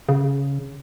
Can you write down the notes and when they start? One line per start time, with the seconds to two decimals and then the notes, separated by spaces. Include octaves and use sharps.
0.09 C#3